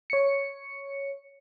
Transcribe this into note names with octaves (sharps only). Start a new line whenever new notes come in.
C#5 C#7